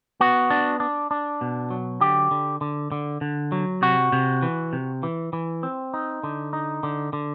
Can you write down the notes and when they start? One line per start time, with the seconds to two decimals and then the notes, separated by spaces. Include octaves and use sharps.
0.21 B3 F#4
0.50 D4
0.80 D4
1.11 D4
1.41 B2
1.70 F#3
2.01 D3 G4
2.31 D3
2.61 D3
2.92 D3
3.21 D3
3.52 F#3
3.82 C3 F#4
4.12 C3
4.42 E3
4.73 C3
5.03 E3
5.33 E3
5.63 C4
5.94 D#4
6.23 D3
6.53 D#4
6.83 D3
7.13 D3